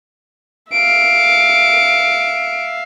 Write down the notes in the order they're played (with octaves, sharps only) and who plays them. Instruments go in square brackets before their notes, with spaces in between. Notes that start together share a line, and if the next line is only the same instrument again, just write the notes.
[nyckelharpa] E5 F5 [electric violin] D7